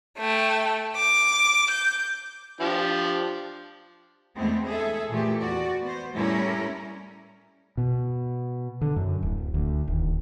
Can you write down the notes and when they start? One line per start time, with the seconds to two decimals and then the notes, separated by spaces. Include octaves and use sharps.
0.18 A3 G5
0.97 D6
1.71 G6
2.61 F3 D4 G4
4.35 E2 D3 G#3 A3 B3 C4
4.66 G#4 A4 E5
5.09 A#2 E3 A3 G4
5.40 E2 F#4 D5
5.82 B3 C5
6.14 A2 G3 A3 C#4 E4 A#4
7.77 B2
8.81 D3
8.96 F#2
9.22 D1
9.54 D2
9.87 D#1